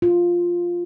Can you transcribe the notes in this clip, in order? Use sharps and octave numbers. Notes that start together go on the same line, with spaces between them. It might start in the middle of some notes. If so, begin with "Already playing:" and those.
F4